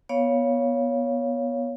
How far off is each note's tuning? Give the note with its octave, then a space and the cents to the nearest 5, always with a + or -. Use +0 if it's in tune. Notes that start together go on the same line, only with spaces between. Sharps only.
B3 -20 C#5 +10 F5 +0